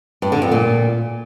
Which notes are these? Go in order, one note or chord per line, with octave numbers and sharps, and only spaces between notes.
G2
D3
F2
A#2